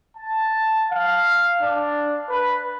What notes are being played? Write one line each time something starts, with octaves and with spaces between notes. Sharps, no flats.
A5
F5
D4
B4